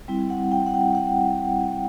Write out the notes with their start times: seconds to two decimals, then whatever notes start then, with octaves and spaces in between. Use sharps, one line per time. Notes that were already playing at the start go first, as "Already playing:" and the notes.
0.08 G3 C4 E4
0.30 F#5
0.52 G5
0.66 F#5
0.74 G5
0.95 F#5